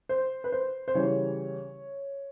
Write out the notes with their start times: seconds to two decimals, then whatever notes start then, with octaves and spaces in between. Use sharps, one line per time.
0.09 C5
0.44 B4
0.52 C5
0.88 C5
0.94 C#3 E3 G3 C#5